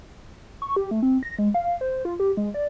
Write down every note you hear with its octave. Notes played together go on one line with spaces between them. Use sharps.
C#6
G4
A3
C4
A#6
G#3
F5
C5
F4
G4
G#3
D5